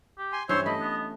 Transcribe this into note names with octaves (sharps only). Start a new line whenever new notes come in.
G4
G#5 C6
G2 E3 C#4 C5 C#5 E5 C6
A3 D#5 B5
B3